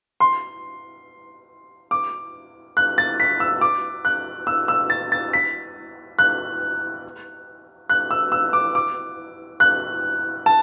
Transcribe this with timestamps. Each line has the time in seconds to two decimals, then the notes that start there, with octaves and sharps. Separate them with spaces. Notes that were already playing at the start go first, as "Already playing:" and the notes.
0.20 C6
1.91 D6
2.77 F#6
2.98 A6
3.20 B6
3.40 E6
3.61 D6
4.05 F#6
4.47 E6
4.68 E6
4.90 A6
5.12 A6
5.33 B6
6.19 F#6
7.89 F#6
8.11 E6
8.32 E6
8.53 D6
8.75 D6
9.60 F#6
10.46 A5